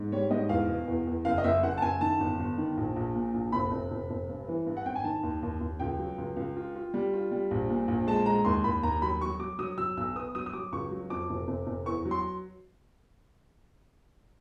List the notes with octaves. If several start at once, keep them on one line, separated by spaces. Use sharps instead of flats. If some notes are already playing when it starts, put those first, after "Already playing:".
Already playing: G#2
G3 C#5
G#2 D#5
E2 F5
B2
E2
E2
F#1 F5
D#5
F#1 E5
F#1 F#5
A5
F#1 G#5
D#3 A5
G1
G1
D#3
A#1
A#1
A#2
A#1
F1 B5
F1
F1
F1
G2
E3
G2
F#5
G#1 G5
G#5
D#3 A5
D#2
D#2
D#2
C#2 G5
F#3
C#2
C#2
F4
F4
G3
F4
G3
A#1
A#2
A#1
G#3 A5
G#3 A#5
D#2 C6
D#2 B5
D#2 A#5
F#3 B5
F#3 C#6
F#3 D6
F#3 D#6
F#3 E6
B1 E6
B3 D#6
F#3 D#6
D#6
F#3 D6
C#2 C#6
F#3
F2 D6
F1
F1
F1
E2 C#6
F#3
C6